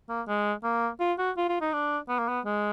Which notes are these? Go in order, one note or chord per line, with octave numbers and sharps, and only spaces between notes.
A#3
G#3
A#3
F4
F#4
F4
F4
D#4
D4
B3
A#3
B3
G#3